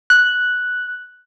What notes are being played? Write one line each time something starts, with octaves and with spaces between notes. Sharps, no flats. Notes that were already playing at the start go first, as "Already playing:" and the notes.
F#6